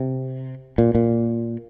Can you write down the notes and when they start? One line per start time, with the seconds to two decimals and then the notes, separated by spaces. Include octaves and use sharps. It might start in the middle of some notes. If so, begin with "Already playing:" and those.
Already playing: C3
0.78 A#2
0.95 A#2